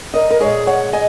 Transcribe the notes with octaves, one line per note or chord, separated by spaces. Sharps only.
A#4 D#5
A#4
A#2 G#3 G#4 C#5
C#5 F#5
D#5 G#5